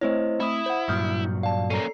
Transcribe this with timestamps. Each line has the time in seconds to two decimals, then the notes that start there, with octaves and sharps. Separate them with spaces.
0.01 A3 C4 E4 C5 C#5 D#5
0.40 A3 C4 E4 B5 D#6
0.66 C5 F#5
0.89 G2 A#2 F#3 D#6 F6 G6
1.43 D5 F5 A5
1.70 A#3 C#4 A4 A#5 C7